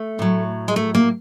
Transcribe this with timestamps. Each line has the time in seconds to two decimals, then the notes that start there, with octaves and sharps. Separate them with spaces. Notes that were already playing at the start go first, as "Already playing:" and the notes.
Already playing: A3
0.19 A2 F#3
0.68 G#3
0.76 A3
0.95 A#3